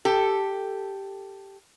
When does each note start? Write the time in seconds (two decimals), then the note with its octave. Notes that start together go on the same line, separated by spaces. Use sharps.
0.05 G4 A4